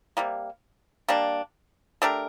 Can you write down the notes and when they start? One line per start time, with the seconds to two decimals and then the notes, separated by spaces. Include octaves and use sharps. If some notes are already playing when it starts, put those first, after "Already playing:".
0.17 C3 G3 A#3
1.08 G3 A#3 D4
2.02 A3 D4 G4 A#4